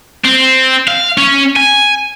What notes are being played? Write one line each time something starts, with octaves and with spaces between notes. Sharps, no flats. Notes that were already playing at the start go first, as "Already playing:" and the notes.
C4
F5
C#4
G#5